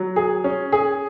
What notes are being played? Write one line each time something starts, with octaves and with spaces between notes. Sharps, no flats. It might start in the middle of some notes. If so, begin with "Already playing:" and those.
Already playing: F#3
G#4
C#4
G#4